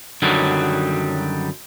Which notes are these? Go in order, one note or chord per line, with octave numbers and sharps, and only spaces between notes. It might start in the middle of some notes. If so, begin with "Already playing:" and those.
F#2 D3 D#3 F#3 G3